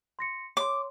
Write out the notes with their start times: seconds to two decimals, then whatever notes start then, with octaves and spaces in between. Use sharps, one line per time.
0.19 C6 A#6 C#7
0.57 C#5 C6 D6